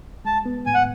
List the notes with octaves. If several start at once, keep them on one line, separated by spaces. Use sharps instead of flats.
G#3 A5
B3
A2 G#5
F#5